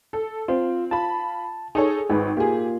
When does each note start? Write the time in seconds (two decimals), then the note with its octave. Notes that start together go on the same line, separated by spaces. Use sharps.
0.13 A4
0.48 C4 F4
0.91 F4 A5 B5
1.75 D#4 G#4 A4 C#5
2.10 G#1 B4
2.37 A#3 F4 G4 G#4